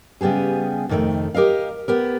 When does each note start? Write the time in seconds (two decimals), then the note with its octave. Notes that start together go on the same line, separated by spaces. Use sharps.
0.21 C#3 G3 B3 G4 G#4
0.89 F2 C3 D#3 G3 A3
1.35 G4 A#4 D#5 F5
1.88 B3 G4 A#4